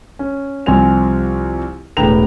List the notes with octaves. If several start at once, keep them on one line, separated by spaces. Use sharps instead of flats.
C#4
C2 F3 C4 G#5 F7
E1 A2 B4 G5 A#5 F7